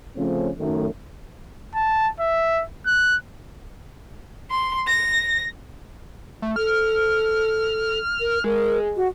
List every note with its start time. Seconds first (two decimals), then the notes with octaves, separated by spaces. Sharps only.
0.16 C#3 F3 A3 C4 C#4
0.59 F#2 D#3 A3
1.75 A5
2.20 E5
2.87 F#6
4.50 C6
4.87 A#6
6.42 A3
6.56 A4 F6
8.20 A#4
8.44 G#3 A#4
8.96 F#4